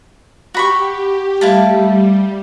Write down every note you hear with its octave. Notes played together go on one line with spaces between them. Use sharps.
F#4 G4 B5 C#6
G3 A3 E4 F5 A5